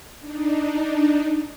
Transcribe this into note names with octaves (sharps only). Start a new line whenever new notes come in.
D4 D#4